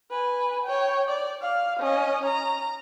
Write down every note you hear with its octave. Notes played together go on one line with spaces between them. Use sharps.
B4 G#5
C#5 G5
D5
F5
C#4 D#5
A#5